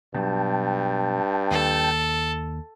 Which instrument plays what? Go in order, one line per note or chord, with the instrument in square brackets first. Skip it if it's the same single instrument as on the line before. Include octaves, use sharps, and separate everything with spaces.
[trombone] G2 [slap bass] B2 F#3 [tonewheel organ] G5 A5
[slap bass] D#2 [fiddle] A4